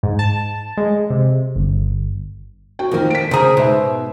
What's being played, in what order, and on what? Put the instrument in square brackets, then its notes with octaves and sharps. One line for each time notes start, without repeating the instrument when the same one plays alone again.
[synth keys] G#2
A5
G#3
C3
G1
[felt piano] F#4 G5
[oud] F2 A#3 [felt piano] D#3 F3
[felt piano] B6 D7
[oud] C#3 G#4 [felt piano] C5 A#5 D#6
[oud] G#2 B2 [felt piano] C5 E5